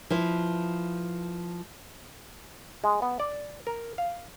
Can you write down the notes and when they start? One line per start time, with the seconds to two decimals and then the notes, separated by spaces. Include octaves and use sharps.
0.10 F3 E4 B4
2.84 G#3
3.02 B3
3.20 D5
3.67 A#4
3.98 F5